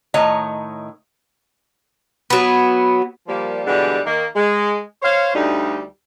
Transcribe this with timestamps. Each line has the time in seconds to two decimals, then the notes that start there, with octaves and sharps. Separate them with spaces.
0.14 A2 D#3 A3 C#5 D#5 A#5
2.30 F#3 B3
3.28 F3 G3 A#3
3.66 B2 D3 E3 G3 G#3 D4
4.05 D#3 A#3
4.36 G#3
5.03 C5 C#5 F5
5.34 D2 G3 D#4